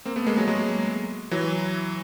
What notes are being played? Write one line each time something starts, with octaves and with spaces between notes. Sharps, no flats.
A#3 C4
A3 B3
G#3 A#3
F#3 G#3
F#3 G#3
E3 F#3